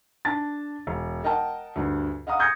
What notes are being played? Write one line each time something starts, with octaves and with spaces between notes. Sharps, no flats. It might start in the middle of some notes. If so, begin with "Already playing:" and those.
D4 A5 A6
E1
A#4 D#5 F#5 G5 A5
D2 G2 D4
D#5 F5 F#5 A#5 D#6
D#6 G6 G#6 A#6 C#7